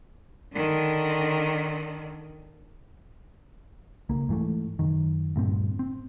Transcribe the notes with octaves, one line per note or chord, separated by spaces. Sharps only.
D3 D#3
C#2 A#3
G#2 E3 F3 A3
F#2 D#3
D2 G2 A#2 C4
C4